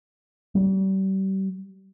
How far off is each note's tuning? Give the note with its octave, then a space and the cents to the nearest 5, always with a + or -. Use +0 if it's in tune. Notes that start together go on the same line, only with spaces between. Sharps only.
G3 -35